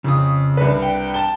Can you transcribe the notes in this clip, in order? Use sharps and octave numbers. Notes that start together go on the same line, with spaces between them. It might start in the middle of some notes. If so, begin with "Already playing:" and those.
F2 C#3 D#6
C2 D4 B4
G5
A5 G7